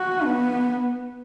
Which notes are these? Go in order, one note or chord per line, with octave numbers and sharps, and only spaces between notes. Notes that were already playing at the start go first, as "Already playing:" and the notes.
Already playing: F#4
B3